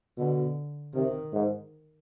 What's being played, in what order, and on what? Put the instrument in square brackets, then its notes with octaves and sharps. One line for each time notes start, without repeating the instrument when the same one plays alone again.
[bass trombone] B2 [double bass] D3
[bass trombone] C3 [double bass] D#3
[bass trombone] G#2